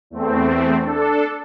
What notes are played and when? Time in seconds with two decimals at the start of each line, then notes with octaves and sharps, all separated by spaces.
0.10 E2 A3 C4
0.80 D4 A4